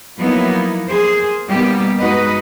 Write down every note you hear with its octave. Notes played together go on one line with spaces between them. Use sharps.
F3 F#3 A#3 B3 D#4 E4
A#3 G#4 C5
B2 G3 A#3 B3 D#4 G4
G2 G#3 D#4 F#4 B4 D#5